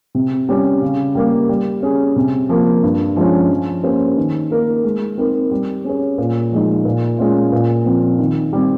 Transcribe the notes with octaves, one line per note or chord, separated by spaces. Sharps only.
C3
G3 C#4 G4
C#3
G3 A#3
G3
C#4 G#4
C3
F3 A#3
G2
F3 G#3 C#4
F3
A#3 C#4 G4 C5
D#3
A#3 D#4 A#4
G#3
C4 D#4 A#4
G3
C#4 G#4 C#5
A#2
F3 G#3 D#4
A#2
G#3 C#4 F4
A#2
F3 C4
D#3
G3 C4